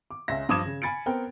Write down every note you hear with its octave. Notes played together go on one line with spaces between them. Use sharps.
D6
C#2 C#4 E5 A#6
G2 F3 D6 D#6 G#6 E7
C#3
G#5 B5 A6 C#7 D7
B3 C4 A#4 G5